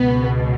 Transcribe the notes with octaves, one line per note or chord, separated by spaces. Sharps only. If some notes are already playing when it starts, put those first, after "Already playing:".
Already playing: C#2 B2 B3